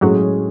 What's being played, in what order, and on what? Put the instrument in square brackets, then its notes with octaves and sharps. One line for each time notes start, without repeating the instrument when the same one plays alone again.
[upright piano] A2 G#3 C#4 G#4 [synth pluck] F#3 F#4